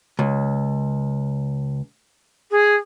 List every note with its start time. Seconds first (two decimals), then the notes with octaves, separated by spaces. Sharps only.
0.19 C#2
2.51 G#4